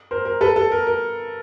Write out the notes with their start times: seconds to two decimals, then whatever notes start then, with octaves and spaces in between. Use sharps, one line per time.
0.11 A#4 C5
0.25 A#4
0.41 A4 B4
0.56 A4
0.72 A#4
0.87 A#4